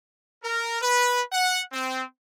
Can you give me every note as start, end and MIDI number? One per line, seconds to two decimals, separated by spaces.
0.43 0.80 70
0.82 1.22 71
1.32 1.61 78
1.72 2.03 60